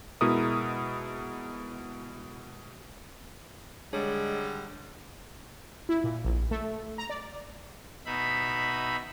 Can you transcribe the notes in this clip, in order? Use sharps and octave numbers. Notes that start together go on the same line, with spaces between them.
B2 G#3 E4 A#4 D#6
D3 G3 G#3 D4 G#4 C#5
E4
A#2
A#1
A3
A#5
D5
B2 D#4 E5 B5